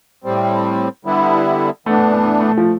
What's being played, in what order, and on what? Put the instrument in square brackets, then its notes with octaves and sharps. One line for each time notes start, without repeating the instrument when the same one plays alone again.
[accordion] A2 G3 C4
D3 G3 B3 E4
[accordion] E3 B3 D4 [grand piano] A3
[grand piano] A3
A3
F3